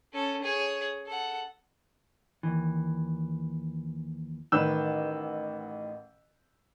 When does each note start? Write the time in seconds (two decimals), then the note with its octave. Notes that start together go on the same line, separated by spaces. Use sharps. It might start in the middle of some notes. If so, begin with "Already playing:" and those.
0.13 C#4 A4
0.42 G#4 C#5
1.06 A4 F#5
2.43 D#2 E3
4.52 A1 D#3 B4 E6 G6 E7